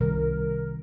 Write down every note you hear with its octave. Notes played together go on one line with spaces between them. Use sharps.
C2 D#3 A#4